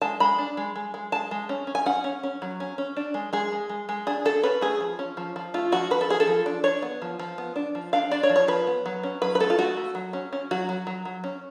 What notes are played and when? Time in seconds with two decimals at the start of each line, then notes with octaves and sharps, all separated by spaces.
0.02 G#3 A5
0.20 G#3 B5
0.38 D4
0.57 G#3
0.76 G#3
0.94 G#3
1.12 G#3 A5
1.31 G#3
1.49 C#4
1.67 C#4
1.75 G#5
1.86 C#4 F#5
2.04 C#4
2.23 C#4
2.42 F#3
2.60 C#4
2.78 C#4
2.97 D4
3.14 G#3
3.33 G#3 G#4
3.52 G#3
3.69 G#3
3.89 G#3
4.07 D4 G#4
4.25 D4 A4
4.43 C#4 B4
4.61 A3 G#4
4.80 F3
4.99 C#4
5.17 F3
5.36 F3
5.54 A3 F4
5.72 F3 F#4
5.91 F3 B4
6.01 A4
6.09 F3 G#4
6.20 A4
6.27 F3
6.46 D4
6.64 D4 C#5
6.82 B3
7.02 F3
7.19 F3
7.38 B3
7.56 D4
7.75 F3
7.93 D4 F5
8.11 D4 D5
8.23 C#5
8.30 F3
8.36 C#5
8.48 F3 B4
8.67 B3
8.86 F#3
9.03 C#4
9.22 F#3 B4
9.35 B4
9.40 A3 A4
9.50 F4
9.59 A3 F#4
9.77 A3
9.95 F#3
10.13 C#4
10.33 C#4
10.51 F#3 F#4
10.69 F#3
10.87 F#3
11.05 F#3
11.24 C#4